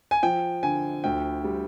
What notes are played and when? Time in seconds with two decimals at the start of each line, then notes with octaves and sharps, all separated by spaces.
0.11 G#5
0.23 F3 G5
0.63 D3 G#5
1.04 D2 G5
1.44 G3